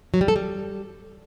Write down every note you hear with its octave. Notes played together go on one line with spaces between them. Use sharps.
F#3
G3
A4
G3